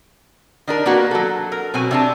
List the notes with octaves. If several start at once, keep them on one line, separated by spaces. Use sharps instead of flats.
D#3 D4 A#4
A#3 B3 F#4
F#3 A4
A#4
B2 F#3 C4 G#5
C3 D4 A5